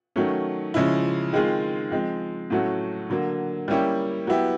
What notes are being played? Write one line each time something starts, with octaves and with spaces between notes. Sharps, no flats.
D#3 F#3 A3 C#4
C#3 F3 G#3 C#4 E4
D#3 G#3 C4 F4 G#4
F3 G#3 C4
A2 F#3 A3 C#4 F#4
D3 F#3 A#3
G3 A#3 C#4 E4 G4
F#3 B3 E4 G4